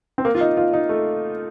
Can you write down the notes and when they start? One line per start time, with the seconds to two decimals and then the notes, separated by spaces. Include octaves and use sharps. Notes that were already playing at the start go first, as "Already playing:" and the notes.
0.18 C4
0.25 A#3
0.35 F4
0.41 D#4
0.57 F4
0.73 D#4
0.89 A3